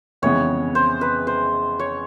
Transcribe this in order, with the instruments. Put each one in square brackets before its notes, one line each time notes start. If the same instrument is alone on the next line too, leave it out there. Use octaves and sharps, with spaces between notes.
[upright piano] F2 C#3 E3 G#3 B3 [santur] C#5
[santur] C5
B4
C5
C#5